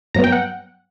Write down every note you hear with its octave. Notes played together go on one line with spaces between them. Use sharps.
G2 F#3 B3 A#5
G5
F#5